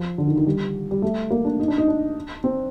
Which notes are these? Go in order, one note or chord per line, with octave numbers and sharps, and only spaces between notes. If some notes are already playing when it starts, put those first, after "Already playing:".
Already playing: F3
D3
D#3
D#3
G3
G3
A3
A#3
D4
D#4
D4
D#4
D4
C4